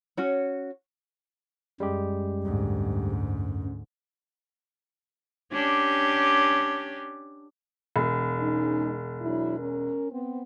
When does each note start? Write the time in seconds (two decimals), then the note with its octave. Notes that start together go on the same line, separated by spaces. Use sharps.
0.17 C#4 F#4 C#5
1.80 F#2 G3 G#3 G4
2.44 D2 G#2
5.52 C#4 D4 G4
7.96 E1
8.39 G#3 C#4 D#4
9.22 F#3 D4 E4
9.59 C#4 A#4
10.11 B3 C4